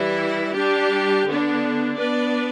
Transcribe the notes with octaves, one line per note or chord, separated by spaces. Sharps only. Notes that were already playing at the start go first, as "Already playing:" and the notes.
Already playing: E3 G3 E4
G3 D4 G4
D3 B3 D4
B3 D4 B4 D5